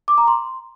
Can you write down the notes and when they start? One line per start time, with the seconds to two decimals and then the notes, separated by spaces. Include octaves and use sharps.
0.08 D6
0.18 A#5
0.28 C6